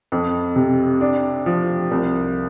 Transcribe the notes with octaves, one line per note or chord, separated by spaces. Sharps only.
F2
C3
D4
F3
C2